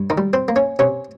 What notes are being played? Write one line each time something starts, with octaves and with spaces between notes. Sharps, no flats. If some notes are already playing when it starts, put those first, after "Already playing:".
Already playing: G2
D#3 D#4
G3
C4 C5
A#3
C#4 C#5
C3 C#4 C#5